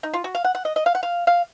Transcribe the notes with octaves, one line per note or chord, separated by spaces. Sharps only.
D#4
F4
F#4
F5
F#5
F#5
D#5
D#5
F5
F#5
F5
F5